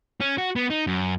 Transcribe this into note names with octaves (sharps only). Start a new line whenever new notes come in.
C#4
F#4
B3
D#4
F#2